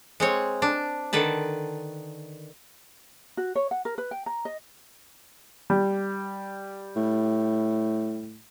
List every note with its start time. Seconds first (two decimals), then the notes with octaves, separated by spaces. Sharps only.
0.20 G#3 C4 C#5
0.62 D4
1.13 D3 D#3 B4 A5
3.37 F#4
3.55 C#5
3.71 F#5
3.85 A#4
3.98 B4
4.11 G5
4.26 A#5
4.45 D#5
5.70 G3
6.96 A2